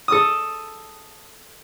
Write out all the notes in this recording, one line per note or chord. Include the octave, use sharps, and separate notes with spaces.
A4 D#6